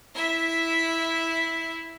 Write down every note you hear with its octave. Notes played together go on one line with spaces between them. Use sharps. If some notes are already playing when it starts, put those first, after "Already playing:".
E4 E5